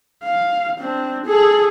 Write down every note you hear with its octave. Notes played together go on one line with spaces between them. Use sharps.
F5
C4 D4
G#4 A4